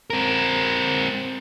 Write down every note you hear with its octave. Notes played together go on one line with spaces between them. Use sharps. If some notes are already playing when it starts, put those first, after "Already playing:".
C4 A#4